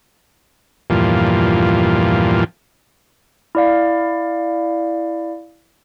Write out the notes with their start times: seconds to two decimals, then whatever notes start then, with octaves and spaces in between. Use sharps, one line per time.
0.90 E2 G2 A#2 F3
3.55 E4 D5 F5